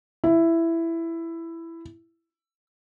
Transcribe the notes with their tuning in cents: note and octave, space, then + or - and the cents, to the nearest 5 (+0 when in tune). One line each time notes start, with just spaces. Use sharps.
E4 +10